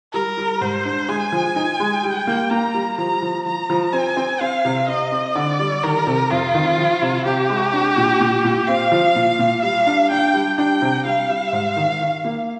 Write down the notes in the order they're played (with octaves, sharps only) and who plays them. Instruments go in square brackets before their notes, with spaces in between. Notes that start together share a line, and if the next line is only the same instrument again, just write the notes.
[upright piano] G3 [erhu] A#4
[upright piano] G3
[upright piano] G#2 [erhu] C5
[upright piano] D4
[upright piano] G#3 [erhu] G#5
[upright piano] F3
D#4
G#3
[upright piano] G3 [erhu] G5
[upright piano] A#3
[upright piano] A#3 [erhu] A#5
[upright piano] G3
[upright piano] F3 [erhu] A#5
[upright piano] F3
[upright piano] F3 [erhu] A#5
[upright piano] F3
[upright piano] C4 [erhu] G#5
[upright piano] C4
[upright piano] C4 [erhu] F5
[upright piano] C3
[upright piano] C4 [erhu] D#5
[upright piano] C4
[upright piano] D3 [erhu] D5
[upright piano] G3
[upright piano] D#3 [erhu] A#4
[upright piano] C3
[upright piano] F2 [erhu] F4
[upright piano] D#3
F3
C3
[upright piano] C3 [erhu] G4
[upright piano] G#3
D4
A#2
A#2
A#2
[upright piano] C4 [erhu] F5
[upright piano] F3
A#2
A#2
[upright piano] G3 [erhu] F5
[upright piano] D4
[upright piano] D4 [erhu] G5
[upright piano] G3
[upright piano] D4 [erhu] G5
[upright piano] C3
[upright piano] G3 [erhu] F5
[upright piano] G3
G#2
D#3
D#3
A#3